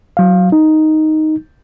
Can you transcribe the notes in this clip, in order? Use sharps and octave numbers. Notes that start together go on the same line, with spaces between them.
F#3 F5
D#4